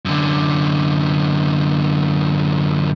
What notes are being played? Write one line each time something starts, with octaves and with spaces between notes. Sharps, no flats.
F#2 D3